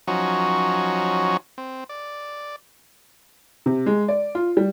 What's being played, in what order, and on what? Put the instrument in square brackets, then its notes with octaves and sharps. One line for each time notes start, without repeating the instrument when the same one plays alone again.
[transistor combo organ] F3 F#3 C#4 D#4 F#4
C4
D5
[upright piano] C3
G#3
D5
F4
G3